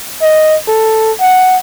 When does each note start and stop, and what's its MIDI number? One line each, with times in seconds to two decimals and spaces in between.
0.22 0.56 75
0.67 1.11 69
1.21 1.57 78